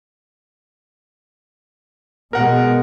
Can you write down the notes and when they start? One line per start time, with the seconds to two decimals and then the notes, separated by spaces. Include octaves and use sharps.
2.33 B2 G#3 A#4 F#5